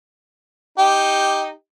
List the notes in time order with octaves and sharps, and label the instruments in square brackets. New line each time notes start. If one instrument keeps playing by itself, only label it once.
[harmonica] D#4 G4